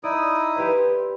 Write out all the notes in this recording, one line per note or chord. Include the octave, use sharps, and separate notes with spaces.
D#4 E4 D5 D#6 A#6
G4 B4 C5